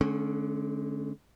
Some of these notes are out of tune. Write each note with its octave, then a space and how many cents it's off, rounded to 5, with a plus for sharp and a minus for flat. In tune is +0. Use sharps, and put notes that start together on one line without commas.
D3 +0 G#3 +45 C#4 -25